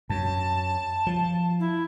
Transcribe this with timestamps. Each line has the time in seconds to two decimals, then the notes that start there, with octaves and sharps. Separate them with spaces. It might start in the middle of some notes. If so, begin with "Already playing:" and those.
0.10 F#2 A5
1.07 F3
1.60 E4